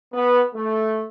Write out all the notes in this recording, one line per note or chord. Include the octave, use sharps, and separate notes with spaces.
B3
A3